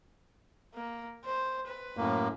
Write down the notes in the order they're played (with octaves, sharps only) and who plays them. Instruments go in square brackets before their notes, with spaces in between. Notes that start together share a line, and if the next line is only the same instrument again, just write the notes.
[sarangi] A#3
C5
B4
[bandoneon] F#2 A2 A#3